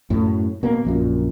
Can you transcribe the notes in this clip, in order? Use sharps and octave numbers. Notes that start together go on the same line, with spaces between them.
F#2 A2
B2 A#3
A#1 F#2 A#2